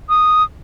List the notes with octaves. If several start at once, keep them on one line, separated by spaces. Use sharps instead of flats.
D#6